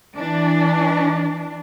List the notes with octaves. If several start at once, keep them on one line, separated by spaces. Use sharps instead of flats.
E3 D4